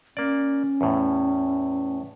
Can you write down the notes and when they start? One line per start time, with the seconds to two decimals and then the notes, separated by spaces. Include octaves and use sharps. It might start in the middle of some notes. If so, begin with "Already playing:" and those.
0.17 A#3 C#4 D5
0.81 E2 A2